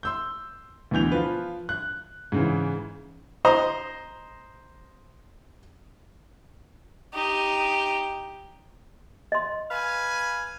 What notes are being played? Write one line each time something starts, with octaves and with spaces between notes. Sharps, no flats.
C6 E6 G6
D2 B2 E3 G6 F7
F3 F4 B4
F#6
G#2 C#3 E3
C5 D#5 A#5 C6
D#4 G4
D#5 C6
B4 F5 G#5